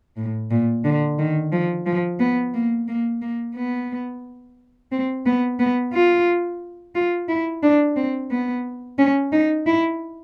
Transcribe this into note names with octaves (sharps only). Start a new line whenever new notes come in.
A2
A#2
D3
D#3
F3
F3
B3
A#3
A#3
A#3
B3
C4
B3
B3
F4
F4
E4
D4
C4
B3
C#4
D#4
E4